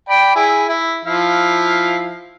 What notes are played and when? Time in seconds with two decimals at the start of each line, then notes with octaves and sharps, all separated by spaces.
0.09 D5 G5 B5
0.35 E4 G#4
0.69 E4
1.05 F3 E4 F5